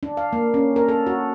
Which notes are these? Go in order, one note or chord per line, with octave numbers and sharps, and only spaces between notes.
D4
F5
A#3
C#4
A#4
A4
F#4